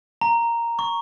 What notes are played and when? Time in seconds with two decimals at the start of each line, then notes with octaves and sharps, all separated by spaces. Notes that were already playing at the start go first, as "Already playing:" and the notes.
0.21 A#5
0.79 C#6